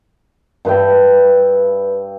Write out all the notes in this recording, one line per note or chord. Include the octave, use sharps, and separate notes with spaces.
G2 B4 E5 G5